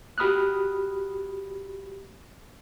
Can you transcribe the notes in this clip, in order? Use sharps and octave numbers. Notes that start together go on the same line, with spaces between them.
F#4 G4 B5 D#6 F6 F#6